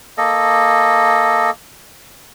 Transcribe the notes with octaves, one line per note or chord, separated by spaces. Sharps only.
A#3 A4 D#5